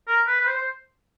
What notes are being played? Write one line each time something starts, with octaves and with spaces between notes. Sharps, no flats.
A#4
B4
B4
C5
C5